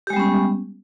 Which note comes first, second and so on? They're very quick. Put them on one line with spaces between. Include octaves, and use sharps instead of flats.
G4 G#3 G3 B3 C#4